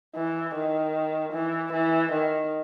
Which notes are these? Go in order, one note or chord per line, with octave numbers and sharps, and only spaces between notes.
E3
D#3
E3
E3
D#3